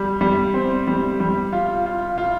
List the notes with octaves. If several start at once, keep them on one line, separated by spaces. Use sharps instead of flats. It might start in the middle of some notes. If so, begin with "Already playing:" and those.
Already playing: G3
G3
C4
G3
G3
F4
F4
F4